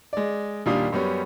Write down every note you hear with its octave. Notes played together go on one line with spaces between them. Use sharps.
G#3 D5
D#2 A#2 G3 D4 F5 D#6
F#2 G3 B3 C#4